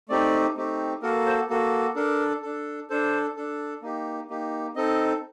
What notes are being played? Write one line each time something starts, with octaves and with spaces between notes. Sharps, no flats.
A3 C4 D#4 G4 D5
A3 C4 D#4 G4
A#3 F#4 A4 A#4
C5
A#3 F#4 A4
D4 A4 A#4
D4 A4
D4 A4 C5
D4 A4
A#3 D#4 G4
A#3 D#4 G4
C4 D#4 A4 D#5